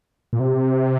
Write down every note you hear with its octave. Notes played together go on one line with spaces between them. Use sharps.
A#2
C3